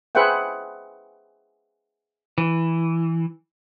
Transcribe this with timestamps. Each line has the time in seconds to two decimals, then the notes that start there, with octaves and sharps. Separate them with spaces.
0.15 G#4 B4 C5 E5 F#5 G5
2.38 E3